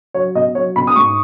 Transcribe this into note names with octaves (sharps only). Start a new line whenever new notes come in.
F#3 C#5
B2 D#5
F#3 C#5
B2 B5
D#6
G#2 C#6